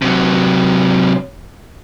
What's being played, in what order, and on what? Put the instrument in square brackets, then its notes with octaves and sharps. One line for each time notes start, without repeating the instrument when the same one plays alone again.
[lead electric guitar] C3 F#3